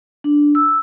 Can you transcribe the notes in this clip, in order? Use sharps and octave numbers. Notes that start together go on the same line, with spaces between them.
D4
E6